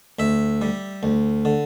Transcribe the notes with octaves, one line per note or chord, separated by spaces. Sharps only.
D2 E5
G3
D2
D3